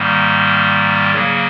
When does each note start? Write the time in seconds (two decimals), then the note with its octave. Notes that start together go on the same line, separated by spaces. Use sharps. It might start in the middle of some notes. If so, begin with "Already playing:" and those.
Already playing: G#2 D#3 G3 A#3
1.14 C#3 F#3 A#3